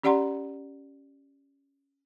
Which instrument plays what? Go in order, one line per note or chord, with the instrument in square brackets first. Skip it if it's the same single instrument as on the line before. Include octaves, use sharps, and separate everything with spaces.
[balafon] C#4 G4 D5 F#5 A#5 C6